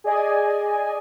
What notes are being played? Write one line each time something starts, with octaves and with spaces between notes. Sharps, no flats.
G#4 D5 D#5 G#5